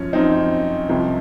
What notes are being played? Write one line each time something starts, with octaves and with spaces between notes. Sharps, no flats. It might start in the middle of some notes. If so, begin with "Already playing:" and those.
Already playing: F#2 F3 C#4
F#2 F3 C4 D#4
C2 C3 F3